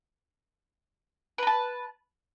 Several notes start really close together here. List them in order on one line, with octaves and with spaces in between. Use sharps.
B4 A#5 A5